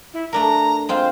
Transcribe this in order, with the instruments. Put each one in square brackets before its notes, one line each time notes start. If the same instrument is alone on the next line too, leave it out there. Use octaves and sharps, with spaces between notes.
[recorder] E4
[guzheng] A3 D4 A#4 [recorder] A#5
[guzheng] G#3 C4 F4 [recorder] C5